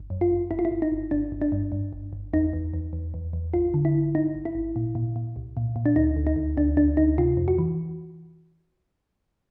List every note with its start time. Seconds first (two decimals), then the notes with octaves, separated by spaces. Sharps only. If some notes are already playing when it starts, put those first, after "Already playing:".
Already playing: G1
0.10 F#2
0.21 F4
0.31 G1
0.51 G1 E4
0.59 F4
0.65 E4
0.71 G1
0.82 D#4
0.92 G1
1.11 G1 D4
1.32 G1
1.42 D4
1.52 G2
1.72 G2
1.93 G1
2.13 G1
2.33 E2 D#4
2.53 E2
2.74 E2
2.93 E2
3.14 E2
3.33 E2
3.54 G#1 F4
3.74 D3
3.85 E4
3.95 G#1
4.15 G#1 D#4
4.35 G#1
4.45 E4
4.55 G#1
4.76 A#2
4.95 A#2
5.16 A#2
5.36 C2
5.57 A#2
5.76 A#2
5.86 D4
5.96 D2 D#4
6.16 D2
6.27 D#4
6.36 D2
6.57 D2 D4
6.77 D2 D4
6.97 D2 D#4
7.18 C3 F4
7.37 F2
7.48 F#4
7.58 E3